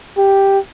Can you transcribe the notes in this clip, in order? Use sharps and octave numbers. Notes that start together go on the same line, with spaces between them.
G4